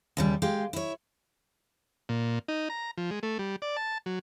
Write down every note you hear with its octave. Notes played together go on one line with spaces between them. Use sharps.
D#2 C#3 G3
G#3 G4 F5
E4 C#5
A#2
D#4
A#5
F3
G#3
A3
G3
D5
A5
F#3